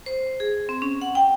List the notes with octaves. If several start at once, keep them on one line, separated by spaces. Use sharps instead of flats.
C5
G#4
C4
C#4
F#5
G5